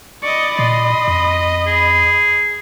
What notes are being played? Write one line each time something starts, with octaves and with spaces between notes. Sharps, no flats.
D5 D#5 B5 C#6
A#2 D#5 C6
F2
G#4